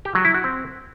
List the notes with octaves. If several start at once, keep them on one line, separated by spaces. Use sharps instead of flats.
G4
F#3
E4
F#4
C4